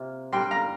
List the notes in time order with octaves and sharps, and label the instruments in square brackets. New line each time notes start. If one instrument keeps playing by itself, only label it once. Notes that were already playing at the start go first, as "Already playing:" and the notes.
Already playing: [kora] C3 A#3 F4
[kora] G3 D4 A#4 [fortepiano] G5 C6
[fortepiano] F5 A#5